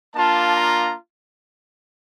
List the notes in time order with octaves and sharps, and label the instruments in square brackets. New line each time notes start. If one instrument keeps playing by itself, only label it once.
[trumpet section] A#3 D4 F4 A5
A#5